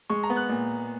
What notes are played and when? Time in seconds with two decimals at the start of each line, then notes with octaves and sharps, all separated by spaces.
0.10 G#3 C#6
0.23 A#5
0.30 B3
0.36 F#6
0.49 A#2